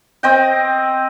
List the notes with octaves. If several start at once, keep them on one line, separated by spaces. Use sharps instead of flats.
C4 D#5 G5